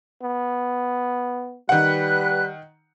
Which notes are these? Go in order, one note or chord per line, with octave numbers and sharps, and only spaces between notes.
B3
D#3 G3 B4 F#5 F#6